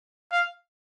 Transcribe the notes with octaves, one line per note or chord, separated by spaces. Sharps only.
F5